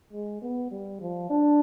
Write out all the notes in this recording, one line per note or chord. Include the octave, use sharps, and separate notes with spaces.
G#3
B3
G3
F3
D4